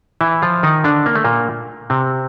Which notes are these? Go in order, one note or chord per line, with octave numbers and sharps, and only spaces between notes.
E3 E4
F3 F4
D#3 D#4
D3 D4
A#3
A3
A#2 A#3
C3 C4